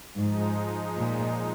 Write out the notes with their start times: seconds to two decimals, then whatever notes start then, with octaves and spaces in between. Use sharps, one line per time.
0.16 G#2 F3 G#3 D#4
0.96 A#2